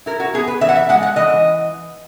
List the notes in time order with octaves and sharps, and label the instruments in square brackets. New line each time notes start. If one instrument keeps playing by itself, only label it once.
[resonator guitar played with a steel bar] E4 A#4
F#4
B3 G#4
B4
E3 E5
F#5
E5
G#3 F#5
F#5
E3 D#5